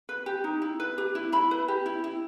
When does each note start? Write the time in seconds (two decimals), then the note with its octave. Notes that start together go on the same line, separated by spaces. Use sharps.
0.09 B4
0.26 G4
0.44 D#4
0.62 E4
0.80 B4
0.98 G4
1.15 E4
1.32 E4 B5
1.51 B4
1.68 G4
1.86 E4
2.04 E4